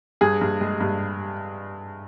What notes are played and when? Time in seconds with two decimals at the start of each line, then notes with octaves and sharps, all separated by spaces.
0.21 G2 G#4
0.41 G2
0.61 G#3
0.80 G2